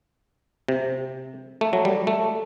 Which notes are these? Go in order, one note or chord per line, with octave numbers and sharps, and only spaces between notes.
C3
A3
F#3
G3
A3